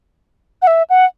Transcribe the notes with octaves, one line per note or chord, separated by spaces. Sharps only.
F#5
E5
F#5